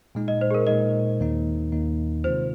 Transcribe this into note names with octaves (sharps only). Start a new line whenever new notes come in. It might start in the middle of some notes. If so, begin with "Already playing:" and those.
A#2 G#3 D#4
D#5
C5
G#4
A#4
A#2 G#3 D#4 D#5
D#2 D#3 A#3 D#4
D#2 D#3 A#3 D#4
C3 D#3 G#3 C4 F4 C5